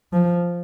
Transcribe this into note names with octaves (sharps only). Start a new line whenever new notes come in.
F3